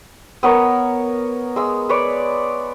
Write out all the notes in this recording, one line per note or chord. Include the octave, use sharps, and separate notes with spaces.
B3 A#4 C#5
G#3 E6
B4 C#5 D5